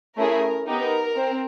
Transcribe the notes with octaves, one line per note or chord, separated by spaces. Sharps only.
A3 C#4 E4 G#4 A#4
B3 D#4 G4 A#4
C4